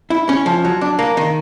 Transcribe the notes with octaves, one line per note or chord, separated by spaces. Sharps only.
E4
C#4
F3
F#3
D4
A#3
D#3